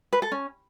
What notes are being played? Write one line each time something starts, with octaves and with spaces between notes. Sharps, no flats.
B4
A4
C#4